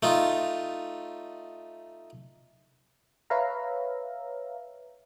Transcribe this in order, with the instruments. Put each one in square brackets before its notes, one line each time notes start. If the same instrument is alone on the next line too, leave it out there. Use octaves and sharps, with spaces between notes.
[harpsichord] A3 D#4 F4
[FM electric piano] B4 C#5 E5 F5 A#5